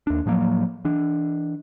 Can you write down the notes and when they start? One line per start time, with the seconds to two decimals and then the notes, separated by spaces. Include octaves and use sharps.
0.07 D#2 D4
0.26 A2 F3 F#3 A#3
0.85 E3 D4